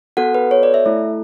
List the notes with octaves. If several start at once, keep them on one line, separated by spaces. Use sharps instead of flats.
B3 F#4 A4 F#5
B4
C#5
D5
E5
A3 E4 A4